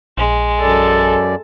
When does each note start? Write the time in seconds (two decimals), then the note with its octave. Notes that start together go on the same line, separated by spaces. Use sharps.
0.18 A#1 G#3
0.62 F#2 A4 D5